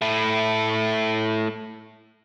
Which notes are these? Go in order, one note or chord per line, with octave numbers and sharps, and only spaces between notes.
A3 E4